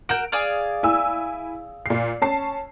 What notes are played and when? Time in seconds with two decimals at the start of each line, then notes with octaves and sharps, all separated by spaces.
0.09 F#4 A#4 G6 D7
0.32 G#4 D5 F5
0.83 E4 G#5 E6
1.86 A#2 C7
2.22 C#4 A5 C7